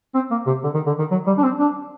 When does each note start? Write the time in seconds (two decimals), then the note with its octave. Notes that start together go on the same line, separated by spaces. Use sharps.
0.15 C4
0.31 A#3
0.47 C3
0.63 D3
0.74 D#3
0.86 D3
0.99 D#3
1.11 F#3
1.27 G3
1.38 D4
1.43 C4
1.59 D4